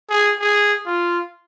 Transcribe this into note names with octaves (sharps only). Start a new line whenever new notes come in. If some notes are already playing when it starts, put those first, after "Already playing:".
G#4
G#4
F4